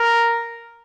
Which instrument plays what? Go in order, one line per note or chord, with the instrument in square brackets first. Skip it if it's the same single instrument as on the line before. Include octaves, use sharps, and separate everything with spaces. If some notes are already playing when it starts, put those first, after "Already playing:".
Already playing: [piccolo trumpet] A#4